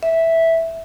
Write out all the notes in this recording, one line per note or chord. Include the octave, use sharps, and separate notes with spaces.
E5